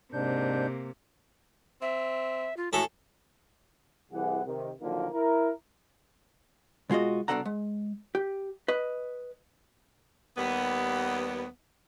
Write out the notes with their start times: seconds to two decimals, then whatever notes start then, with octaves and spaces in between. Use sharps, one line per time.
0.13 G#2 C3 A#3 D4 G6
1.82 C4 E5
2.57 F4
2.73 A2 F#4 G#4 A4
4.12 C2 E3 G#4 F#5
4.45 C3 D#3
4.81 A#2 D3 D#3 F3 F#3 A#3
5.12 E4 A#4
6.90 B2 G#3 F4 F#4 D#5
7.28 C2 B2 D4 A4 F#5 A#5
7.45 G#3
8.15 G4
8.68 B4 D#5
10.37 D#2 G3 B3